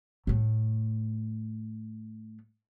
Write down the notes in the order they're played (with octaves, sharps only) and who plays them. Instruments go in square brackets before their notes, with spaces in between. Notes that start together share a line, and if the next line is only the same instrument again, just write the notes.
[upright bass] A2 A3